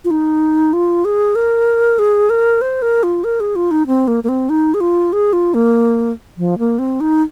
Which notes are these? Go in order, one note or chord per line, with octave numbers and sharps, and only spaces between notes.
F4
D#4
F4
G#4
A#4
G#4
A#4
C5
A#4
F4
A#4
G#4
F4
D#4
C4
A#3
A#3
C4
D#4
G#4
F4
G#4
F4
A#3
F3
A#3
C4
D#4